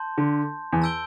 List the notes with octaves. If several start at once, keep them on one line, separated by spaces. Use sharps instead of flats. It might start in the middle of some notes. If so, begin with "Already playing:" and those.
Already playing: A5 C6 G6
D3
E2
A5 E6 G6 D7 G7